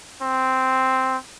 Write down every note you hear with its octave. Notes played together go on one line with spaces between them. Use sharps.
C4